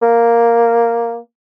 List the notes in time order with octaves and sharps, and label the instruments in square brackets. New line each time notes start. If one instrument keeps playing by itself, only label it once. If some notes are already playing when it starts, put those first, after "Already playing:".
[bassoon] A#3